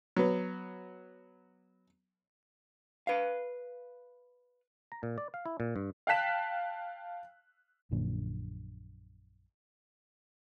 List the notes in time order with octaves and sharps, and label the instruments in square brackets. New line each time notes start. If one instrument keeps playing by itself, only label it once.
[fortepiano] F#3 B3
[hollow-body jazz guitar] B4 F5
[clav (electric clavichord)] A#5
A#2
D5
F5
E4
A#2
G2
[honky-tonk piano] F5 G5 A5 F#6 B6 E7
[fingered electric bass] A#1 F#2 A#2 D3